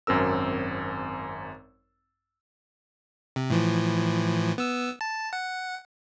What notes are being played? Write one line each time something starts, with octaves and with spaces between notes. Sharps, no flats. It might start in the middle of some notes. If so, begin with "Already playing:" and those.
G#1 F#2 C4 A#4 E6
C3
A2 E3 F3
B3 E6
A5
F#5